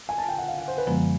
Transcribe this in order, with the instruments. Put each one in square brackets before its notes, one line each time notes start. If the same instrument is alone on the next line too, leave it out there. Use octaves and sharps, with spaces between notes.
[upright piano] G#5
A5
G5
F#5
F5
F#5
C5
B4
[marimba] F#2 D3 F3 G#3 B3